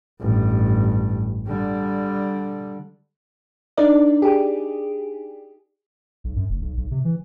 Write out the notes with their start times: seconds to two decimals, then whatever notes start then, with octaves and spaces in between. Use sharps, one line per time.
0.21 A1 G2
1.47 D3 G3
3.77 D4 D#4 A#4 D5
4.22 G4 G#4
6.24 B1
6.36 F#2
6.49 F1
6.61 B1
6.77 B1
6.91 C3
7.05 E3